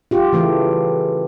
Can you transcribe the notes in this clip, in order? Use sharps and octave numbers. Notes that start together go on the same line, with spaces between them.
F4 G4
C#3 E3 A3